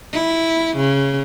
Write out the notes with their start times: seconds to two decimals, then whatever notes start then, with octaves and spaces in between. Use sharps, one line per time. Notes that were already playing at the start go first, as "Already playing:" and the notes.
0.13 E4
0.76 C#3